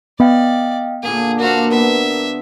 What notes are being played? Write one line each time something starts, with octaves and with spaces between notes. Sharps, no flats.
B3 D5 D#5 F5 G5
A#2 D3 A#3 G#4
A#3 D4 F#4 A#4 C5 F5
B3 A#4 E5